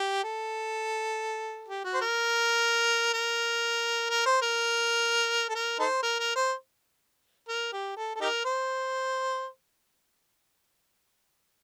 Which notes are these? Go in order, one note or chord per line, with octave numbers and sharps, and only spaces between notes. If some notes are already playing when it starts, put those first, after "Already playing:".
Already playing: G4
A4
G4
F#4
C5
A#4
A#4
A#4
C5
A#4
A4
A#4
D#4 A4 C5
A#4
A#4
C5
A#4
G4
A4
A4
D#4 G4 A#4
C5